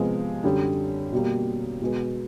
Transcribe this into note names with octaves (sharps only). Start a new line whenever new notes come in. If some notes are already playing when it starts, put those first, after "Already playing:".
Already playing: C3 F3 G#3 B3
F#2 D3 G3
B2 G3 A#3
B2 G#3 B3